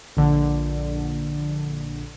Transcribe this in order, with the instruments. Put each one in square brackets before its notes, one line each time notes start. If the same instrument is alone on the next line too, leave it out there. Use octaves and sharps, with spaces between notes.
[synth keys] A#1 D3